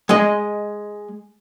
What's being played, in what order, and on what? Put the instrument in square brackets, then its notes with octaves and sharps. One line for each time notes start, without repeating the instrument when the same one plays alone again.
[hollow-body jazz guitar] G#3 D#5